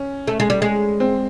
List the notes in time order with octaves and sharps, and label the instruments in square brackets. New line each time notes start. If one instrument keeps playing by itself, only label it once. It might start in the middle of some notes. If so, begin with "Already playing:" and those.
Already playing: [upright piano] C#4
[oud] A3
G#3
G3
G#3
[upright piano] C4